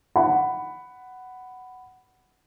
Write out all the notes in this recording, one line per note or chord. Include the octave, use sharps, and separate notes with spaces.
F#5 B5